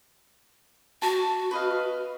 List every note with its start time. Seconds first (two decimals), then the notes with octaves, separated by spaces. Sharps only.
1.02 F#4 A5
1.51 B4 D#5 F5